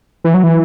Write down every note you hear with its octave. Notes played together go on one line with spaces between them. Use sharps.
E3
F#3
E3